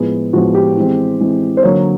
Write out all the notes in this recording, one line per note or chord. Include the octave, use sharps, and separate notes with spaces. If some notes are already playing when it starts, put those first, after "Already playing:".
Already playing: A2 F3 G#3 B3
A2 F3 G#3 B3 F#4
G4
E3 G#3 C4
E3 G#3 C4
C5
D3 F#3 A#3 C#5